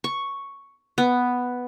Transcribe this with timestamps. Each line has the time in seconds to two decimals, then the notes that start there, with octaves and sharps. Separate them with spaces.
0.04 C#6
0.98 B3